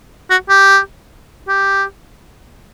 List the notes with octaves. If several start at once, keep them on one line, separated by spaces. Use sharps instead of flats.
F#4
G4
G4